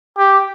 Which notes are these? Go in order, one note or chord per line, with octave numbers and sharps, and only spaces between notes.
G4